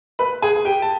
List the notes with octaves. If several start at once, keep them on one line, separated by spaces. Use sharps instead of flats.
B4 B5
G#4 G#5
G4 G5
A5